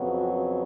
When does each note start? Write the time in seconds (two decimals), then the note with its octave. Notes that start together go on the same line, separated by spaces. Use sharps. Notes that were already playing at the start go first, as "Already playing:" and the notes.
Already playing: F2 C#3 F#3 B3
0.15 F#4